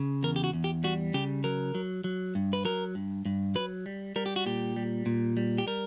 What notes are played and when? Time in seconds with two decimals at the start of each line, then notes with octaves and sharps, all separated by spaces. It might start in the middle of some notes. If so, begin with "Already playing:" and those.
Already playing: C#3
0.23 E2 A#4
0.36 G4
0.44 F#4
0.53 E2
0.64 G4
0.84 G3 F#4
1.14 C#3 G4
1.44 F#3 A#4
1.75 F#3
2.04 F#3
2.35 G2
2.53 B4
2.65 F#3 A#4
2.95 G2
3.25 G2
3.55 F#3 B4
3.86 G3
4.16 G3 A#4
4.26 G4
4.36 F#4
4.46 A#2 G4
4.76 G3
5.06 A#2
5.37 G3
5.58 G4
5.67 G3 A#4